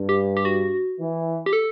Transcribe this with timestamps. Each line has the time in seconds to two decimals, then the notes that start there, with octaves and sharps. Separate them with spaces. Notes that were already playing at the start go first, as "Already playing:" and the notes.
Already playing: G2
0.09 G4
0.37 G4
0.45 F#4
0.99 E3
1.46 G4
1.53 A4